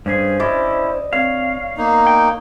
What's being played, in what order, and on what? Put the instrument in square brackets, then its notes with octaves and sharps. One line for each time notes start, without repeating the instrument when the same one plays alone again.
[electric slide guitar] G2 C#4 G#4 [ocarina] C5
[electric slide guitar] C#4 E4 [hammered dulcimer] D5 D#5
[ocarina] C4 [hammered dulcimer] C#5 [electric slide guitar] F5
[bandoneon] A#3 D#4 [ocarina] B3
[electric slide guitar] G5